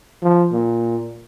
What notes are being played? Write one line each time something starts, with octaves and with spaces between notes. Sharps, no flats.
F3
A#2